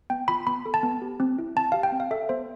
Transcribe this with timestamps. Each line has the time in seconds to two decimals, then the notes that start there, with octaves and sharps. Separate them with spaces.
0.10 B3 G5
0.28 F4 B5
0.47 B3 B5
0.66 A4
0.74 A5
0.83 B3
1.02 G4
1.20 C4
1.38 E4
1.56 C4 A5
1.72 G4 F5
1.83 G5
1.92 C4
2.00 F5
2.11 A4 E5
2.29 B3 C5